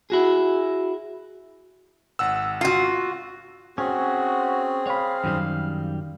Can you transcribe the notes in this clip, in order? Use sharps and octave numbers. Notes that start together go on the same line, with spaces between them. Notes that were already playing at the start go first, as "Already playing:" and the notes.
E4 F#4 G#4
G#1 F#5 E6
F4 F#4
C4 C#4 F#4 G#4
C#5 F5 B5
F#2 D#3 G3